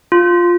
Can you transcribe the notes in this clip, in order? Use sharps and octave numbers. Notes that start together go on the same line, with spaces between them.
F4